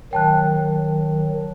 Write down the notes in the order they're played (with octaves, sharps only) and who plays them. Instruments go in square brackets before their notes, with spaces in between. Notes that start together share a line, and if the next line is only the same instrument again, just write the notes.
[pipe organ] D#3 F#3 [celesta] G5 A5 F#6